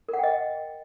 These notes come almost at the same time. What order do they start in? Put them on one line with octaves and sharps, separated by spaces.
A#4 F#5 G5 D#5